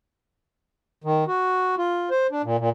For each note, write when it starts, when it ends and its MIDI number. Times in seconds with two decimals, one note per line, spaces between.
1.04 1.24 51
1.28 1.75 66
1.78 2.10 65
2.11 2.27 72
2.32 2.42 62
2.44 2.57 46
2.59 2.70 46